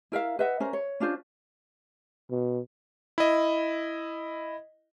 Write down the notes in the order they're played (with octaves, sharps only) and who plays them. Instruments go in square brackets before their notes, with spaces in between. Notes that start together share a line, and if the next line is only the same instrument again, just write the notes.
[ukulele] E4 A#4 E5 F5
B4 D#5 E5 F#5
C#4 A#4 C5
C#5
C#4 D4 F4 C5
[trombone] B2
[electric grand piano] E4 D#5